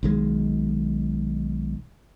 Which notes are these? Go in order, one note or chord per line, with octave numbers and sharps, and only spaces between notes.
B1 D#3 G#3